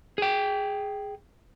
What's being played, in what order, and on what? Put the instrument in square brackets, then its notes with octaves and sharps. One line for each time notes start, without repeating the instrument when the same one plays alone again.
[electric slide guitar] G#4 G5